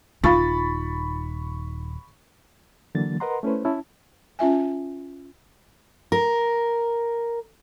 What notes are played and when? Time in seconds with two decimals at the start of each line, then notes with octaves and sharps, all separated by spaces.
0.24 D#1 D#4 F4 F5 B5 C#6 A6
2.95 D3 E3 F#3 A#3 A6
3.20 A#4 B4 D#5 F#5 A#5 C6
3.43 A3 C#4 E4 B4 C5
3.65 C#4 E4 A5
4.39 C#4 F4 E5 G#5
6.12 A#4